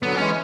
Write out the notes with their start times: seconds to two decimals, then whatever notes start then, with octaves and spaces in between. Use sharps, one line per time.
0.02 D3 F#3 B3
0.16 E3 G#3 C#4